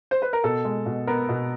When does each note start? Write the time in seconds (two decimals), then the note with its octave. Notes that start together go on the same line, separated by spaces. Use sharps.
0.11 C5
0.22 B4
0.33 A#4
0.44 B2 A4
0.65 G#3
0.86 B2
1.07 B3 A#4
1.29 B2